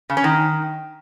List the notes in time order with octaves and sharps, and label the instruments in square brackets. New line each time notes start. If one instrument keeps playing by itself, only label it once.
[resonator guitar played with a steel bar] C#3
C#4
D#3